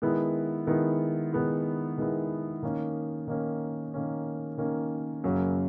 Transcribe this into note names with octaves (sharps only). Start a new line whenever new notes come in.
D#3 G#3 B3 E4
D#3 G#3 B3 E4
D#3 G#3 B3 E4
D#3 G#3 B3 E4
D#3 A#3 C#4
D#3 A#3 C#4
D#3 A#3 C#4
D#3 A#3 C#4
F#2 C#3 F#3 A#3 C#4